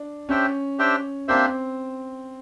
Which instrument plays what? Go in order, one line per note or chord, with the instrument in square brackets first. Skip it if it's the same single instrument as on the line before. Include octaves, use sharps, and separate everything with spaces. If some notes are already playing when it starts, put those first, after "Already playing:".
Already playing: [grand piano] D4
[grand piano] C#4 [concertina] D4 G4 C5 E5 G5
[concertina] D4 G4 C5 E5 G5
[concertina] A#3 D4 G4 C5 E5 [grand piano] C4